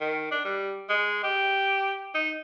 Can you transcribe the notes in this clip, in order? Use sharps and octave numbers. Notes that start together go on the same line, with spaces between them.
D#3
D4
G3
G#3
G4
D#4